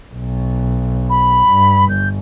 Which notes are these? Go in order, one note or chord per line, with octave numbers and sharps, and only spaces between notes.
B1
B5
G2
G1 G6